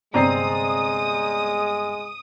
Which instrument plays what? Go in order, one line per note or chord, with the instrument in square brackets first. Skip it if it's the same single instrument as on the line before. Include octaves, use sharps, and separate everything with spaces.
[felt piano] G1 C3 C7 [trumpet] G#3 [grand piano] C4 D5 A#5 [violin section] D#6